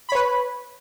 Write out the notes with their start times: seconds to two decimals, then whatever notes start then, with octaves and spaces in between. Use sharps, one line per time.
0.09 B5
0.12 C#5
0.15 B4